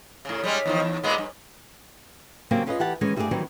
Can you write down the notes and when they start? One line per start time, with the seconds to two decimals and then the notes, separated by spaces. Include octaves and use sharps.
0.25 A2 C#3
0.43 G3 G#3 C#4
0.66 E2 D#3 F3
0.80 E2
1.03 A#2 G#3 B3
1.18 G2
2.51 C#3 F#3 A#3 C4 C#4 G4
2.67 C#4 F4 G#4 B4 C#5 D#5
2.80 E3 G4 F#5 A5
3.01 D#3 E3 G#3 C#4
3.16 G2 G3 A3 B3 G#4 D5
3.31 D#3 E3 F#3 G3 C4